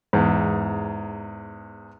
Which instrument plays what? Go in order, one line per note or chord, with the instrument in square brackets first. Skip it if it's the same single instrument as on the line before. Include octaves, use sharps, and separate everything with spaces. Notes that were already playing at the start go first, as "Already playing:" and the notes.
[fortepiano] E2 G#2